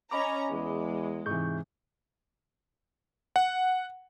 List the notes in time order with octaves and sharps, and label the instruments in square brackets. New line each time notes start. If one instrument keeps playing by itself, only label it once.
[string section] C#4 A#5 [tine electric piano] D#5 B5 D6
[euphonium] E2 [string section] G#3
[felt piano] G#2 C3 E3 [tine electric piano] C#6 G6
[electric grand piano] F#5